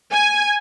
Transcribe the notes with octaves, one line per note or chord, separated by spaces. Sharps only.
G#5